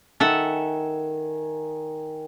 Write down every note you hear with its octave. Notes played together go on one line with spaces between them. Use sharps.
D#3 A4 E5 F#5 G#5